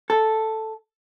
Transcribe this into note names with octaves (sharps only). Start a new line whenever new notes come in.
A4